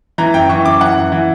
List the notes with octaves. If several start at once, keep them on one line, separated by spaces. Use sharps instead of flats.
E3 A#5
F#2 G5
E3 C#6
F#2 D6
E3 F#5
F#2
E3